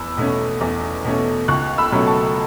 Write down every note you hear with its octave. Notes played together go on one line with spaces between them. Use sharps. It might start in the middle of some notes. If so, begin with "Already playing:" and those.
Already playing: E2 B5 E6
B2 A3 C#4
E2
B2 A3 C#4
C#2 C#6 F#6
B5 E6
B2 F#3 A3 C#4
A5 C#6